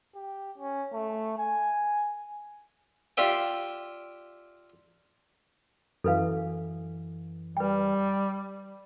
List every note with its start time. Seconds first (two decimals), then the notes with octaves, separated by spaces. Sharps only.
0.16 G4
0.58 C#4
0.93 A3
1.38 G#5
3.17 F4 G4 D5 E5 G5
6.04 F#2 E3 A4 B4 F5
7.57 G3 B4 G5